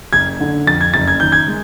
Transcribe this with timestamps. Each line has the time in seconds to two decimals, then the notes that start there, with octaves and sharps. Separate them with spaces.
0.13 F#1 G#6
0.40 D3
0.67 F2 A6
0.81 G#6
0.94 F#1 A6
1.08 G#6
1.20 D#3 G6
1.32 G#6
1.48 G#3